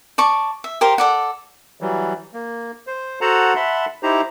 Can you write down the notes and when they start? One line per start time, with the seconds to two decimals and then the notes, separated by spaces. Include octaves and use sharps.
0.18 D5 A5 C#6
0.64 E5
0.81 G4 A#4 C5 F5
0.98 A4 D5 F#5
1.81 E3 F#3 G3
2.34 A#3
2.87 C5
3.21 F#4 A4 C5 F#5 A5 A#5
3.56 E5 F#5 A5 B5 C6
4.03 D#4 E4 G4 C5 A#5